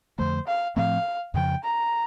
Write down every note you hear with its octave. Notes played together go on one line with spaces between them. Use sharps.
F2 D3 F3 A3 C5
F5
A2 F3 A3 C4 F5
F2 C#3 F3 G5
A#5